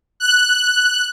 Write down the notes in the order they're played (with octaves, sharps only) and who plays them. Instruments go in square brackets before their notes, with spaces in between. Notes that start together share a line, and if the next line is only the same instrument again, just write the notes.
[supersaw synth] F#6